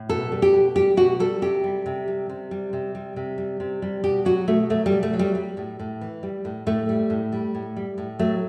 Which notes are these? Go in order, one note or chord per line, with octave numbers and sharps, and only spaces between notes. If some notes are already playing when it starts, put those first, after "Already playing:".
Already playing: A2
B2 A4
G3
G4
B2
G3 G4
B2 F#4
G3 A4
C3 G4
G3
C3
G3
C3
G3
C3
G3
C3
G3
C3
G3
B2 G4
F#3 F#4
B2 A3
F#3 A3
G3
B2
A3
F#3
G3
G3
A2
A2
E3
G3
A2
A2 A3
G3
A2
G3
A2
G3
A2
F#3 A3